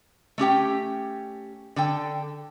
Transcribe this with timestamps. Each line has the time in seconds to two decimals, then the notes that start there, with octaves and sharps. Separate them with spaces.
0.38 A3 C#4 G4 G5
1.76 D3 A4 G5